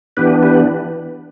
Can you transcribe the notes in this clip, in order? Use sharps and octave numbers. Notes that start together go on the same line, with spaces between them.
E3 B3 D4 G4 B4
G4 B4